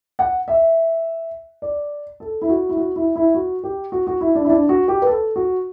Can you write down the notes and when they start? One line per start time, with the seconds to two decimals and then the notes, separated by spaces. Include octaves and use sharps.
0.19 F#5
0.48 E5
1.62 D5
2.20 A4
2.42 E4
2.49 F#4
2.69 E4
2.77 F#4
2.96 E4
3.16 E4
3.35 F#4
3.64 G4
3.92 F#4
4.07 F#4
4.21 E4
4.35 D4
4.44 E4
4.50 D4
4.69 F#4
4.88 G4
5.02 B4
5.07 A4
5.36 F#4